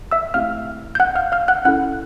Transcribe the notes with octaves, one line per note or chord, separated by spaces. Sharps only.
E5 E6
A3 C4 E4 G4 F5 F6
G6
F#5 F#6
F5 F6
F5 F6
F#5 F#6
C#4 E4 A4 F#5 F#6